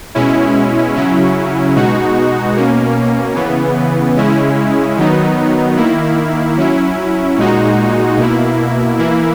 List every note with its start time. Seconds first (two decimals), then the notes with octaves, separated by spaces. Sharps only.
0.15 B2 G#3 C#4 E4
0.95 C#3 F#3 C#4 E4
1.75 B2 G#3 D#4 F#4
2.56 B2 A#3 C#4
3.36 C#3 E3 B3
4.16 C#3 G#3 C#4 E4
4.96 D#3 F#3 B3 D#4
5.77 D#3 A#3 E4
6.57 F#3 C#4 E4
7.38 A#2 G#3 D#4 F#4
8.17 B2 A#3 E4
8.99 E3 A#3 E4